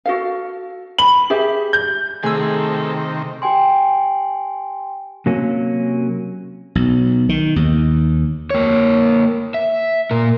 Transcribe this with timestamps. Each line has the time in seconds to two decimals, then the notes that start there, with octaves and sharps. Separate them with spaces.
0.06 F#4 A4 F5
0.98 B5 F#7
1.30 G4 G#4 E5
1.73 G6
2.23 C3 D#3 A3 G#4 A4 G#5 E6
3.42 G4 G5 G#5 C6
5.26 C3 F#3 A#3 C#4
6.75 B1
7.29 D#3
7.56 D#2
8.50 A#3 C#5
9.54 E5
10.11 A#2 A#4